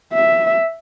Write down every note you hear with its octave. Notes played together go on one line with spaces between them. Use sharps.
E5